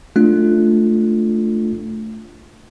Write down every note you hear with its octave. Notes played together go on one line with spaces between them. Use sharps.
A3 D4 F4